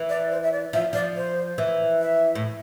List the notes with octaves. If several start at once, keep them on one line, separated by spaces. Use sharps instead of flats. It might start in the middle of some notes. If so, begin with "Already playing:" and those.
Already playing: E3
D5
C5
E5
D5
F3 E5
F3 D5
C5
E3
E5
A2